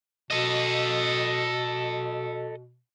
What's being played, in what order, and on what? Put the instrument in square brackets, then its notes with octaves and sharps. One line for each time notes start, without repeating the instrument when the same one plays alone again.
[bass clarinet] B2 [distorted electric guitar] A4 D#5